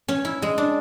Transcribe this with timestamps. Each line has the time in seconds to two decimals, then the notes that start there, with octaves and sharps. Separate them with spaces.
0.08 C#4
0.25 E4
0.42 G#3
0.58 D4